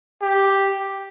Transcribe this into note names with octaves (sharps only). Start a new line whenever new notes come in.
G4